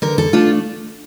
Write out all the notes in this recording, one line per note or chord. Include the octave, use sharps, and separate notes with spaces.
D3 A#4
A4
A3 D4 F4